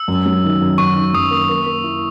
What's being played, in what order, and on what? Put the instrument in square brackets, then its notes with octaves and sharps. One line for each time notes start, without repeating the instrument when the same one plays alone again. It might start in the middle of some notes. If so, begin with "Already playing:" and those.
Already playing: [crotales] E6
[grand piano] F#2
F#3
D#3
F#2
[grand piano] F#2 [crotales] C#6
[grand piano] D#3
[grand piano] F#2 [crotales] D#6
[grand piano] A#3
A#3
A#3
E4